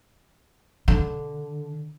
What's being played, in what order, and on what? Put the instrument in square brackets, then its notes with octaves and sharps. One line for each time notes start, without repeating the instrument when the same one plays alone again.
[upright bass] D3